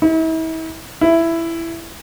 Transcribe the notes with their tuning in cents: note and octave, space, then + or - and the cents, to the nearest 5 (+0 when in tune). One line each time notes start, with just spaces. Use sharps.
E4 -40
E4 +10